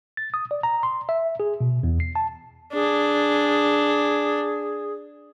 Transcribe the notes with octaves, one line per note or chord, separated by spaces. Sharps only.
A6
D#6
D5
A#5
C6
E5
G#4
B2
E2
C7
A5
D4 G#4